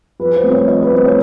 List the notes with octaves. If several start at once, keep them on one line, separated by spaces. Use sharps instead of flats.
F3 B4
C5
A3 C4
C#5
F3 D#5
B4
A3 C4 C5
C#5